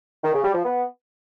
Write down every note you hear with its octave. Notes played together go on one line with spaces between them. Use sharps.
D#3
C#3
G3
F3
B3